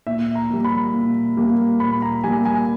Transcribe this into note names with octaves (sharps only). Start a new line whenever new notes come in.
A#2 E5
A#5
G3 A#3
B5
A#2
G3 A#3
A#2 B5
A#5
G3 A#3 G#5
G#5